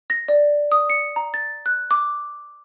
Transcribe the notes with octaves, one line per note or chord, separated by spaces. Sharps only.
A#6
D5
D#6
C#7
A#5
A6
F#6
D6